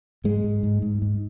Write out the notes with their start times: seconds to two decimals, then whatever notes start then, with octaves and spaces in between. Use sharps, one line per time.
0.24 G#2 G#3
0.44 G#2
0.63 G#2
0.82 G#2
1.02 G#2